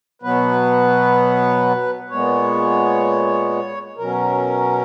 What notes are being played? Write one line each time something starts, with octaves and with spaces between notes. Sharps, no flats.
B2 F#3 B3 B4
A#2 G#3 B3 C#5
B2 F#3 C#4 A#4